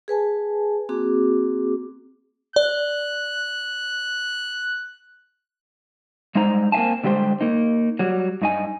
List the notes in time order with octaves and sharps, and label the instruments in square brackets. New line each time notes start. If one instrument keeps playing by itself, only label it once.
[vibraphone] G#4 B4 G#5 A5
A#3 C4 F#4 G#4 D6
[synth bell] D5 [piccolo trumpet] F#6
[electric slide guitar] G3 G#3 D#4 C5 A#5
A#3 C4 E5 F5 G#5 A5
D3 G3 G#3 G4 C5
A#3 D#4
F#3 G3
G2 D#4 G#5